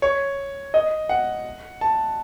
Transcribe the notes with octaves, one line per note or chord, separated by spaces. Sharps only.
C#5
D#5
F#5
A5